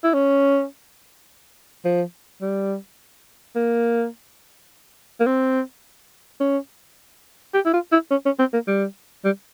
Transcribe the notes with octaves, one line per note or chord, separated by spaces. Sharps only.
E4
C#4
F3
G3
A#3
A#3
C4
C#4
G4
E4
F4
E4
C#4
C#4
C4
A#3
G3
G3